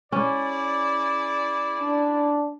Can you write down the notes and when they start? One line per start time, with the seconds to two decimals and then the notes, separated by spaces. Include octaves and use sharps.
0.12 C#4 E4 G#4 D5
1.81 D4